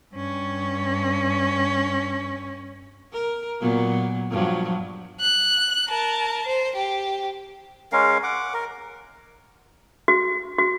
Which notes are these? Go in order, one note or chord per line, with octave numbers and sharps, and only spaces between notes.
G2 C#4
A#4
A#2 F#3 B3
G2 F3 F#3
F#6
A#4 A5
C5
G4
G#3 C#4 A#4 F5
F#5 D6
A#4
F#4
F#4